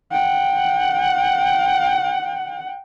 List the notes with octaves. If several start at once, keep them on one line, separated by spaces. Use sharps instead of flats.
F#5 G5